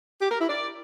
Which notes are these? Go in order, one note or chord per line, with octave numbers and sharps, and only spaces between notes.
G4
A#4
E4
D5